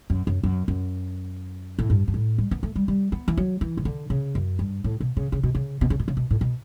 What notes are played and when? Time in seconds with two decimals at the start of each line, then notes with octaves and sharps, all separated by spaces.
0.10 F#2
0.27 F#2
0.43 F#2
0.68 F#2
1.79 A2
1.90 G2
2.08 G2
2.14 A2
2.38 G3
2.51 B3
2.63 A3
2.76 G3
2.88 G3
3.12 B3
3.28 E3
3.38 F#3
3.61 E3
3.77 C#3
3.85 D3
4.10 C#3
4.35 F#2
4.59 G2
4.84 A2
5.00 B2
5.17 C#3
5.32 C#3
5.43 B2
5.55 C#3
5.81 B2
5.90 C#3
6.00 B2
6.08 C#3
6.17 B2
6.31 A2
6.41 B2